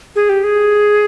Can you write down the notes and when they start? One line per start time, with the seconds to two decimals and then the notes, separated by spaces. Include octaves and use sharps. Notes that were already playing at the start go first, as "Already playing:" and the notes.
0.16 G#4
0.29 G4
0.44 G#4